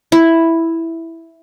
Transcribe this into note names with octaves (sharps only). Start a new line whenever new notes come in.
E4